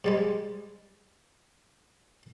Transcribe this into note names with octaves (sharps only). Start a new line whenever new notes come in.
G#2 G3 G#3